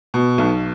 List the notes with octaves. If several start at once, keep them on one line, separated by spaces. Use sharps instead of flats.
B2
B1